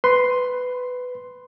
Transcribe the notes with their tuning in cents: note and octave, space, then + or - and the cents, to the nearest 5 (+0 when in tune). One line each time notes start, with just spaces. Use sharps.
B4 +15 C6 +0